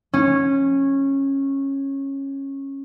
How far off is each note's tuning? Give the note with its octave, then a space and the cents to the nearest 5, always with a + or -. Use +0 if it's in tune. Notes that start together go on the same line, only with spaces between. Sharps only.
C#4 -15